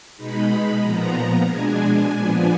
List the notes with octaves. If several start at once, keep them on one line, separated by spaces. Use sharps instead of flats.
B2 G#3 D#4 B5
A#2 F3 B3 A#5
B2 G#3 D4 G#5
A#2 F3 B3 D4